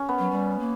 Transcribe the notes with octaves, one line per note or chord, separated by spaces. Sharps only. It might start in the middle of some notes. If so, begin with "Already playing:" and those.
Already playing: C#4
B3
F#3
G3
A#3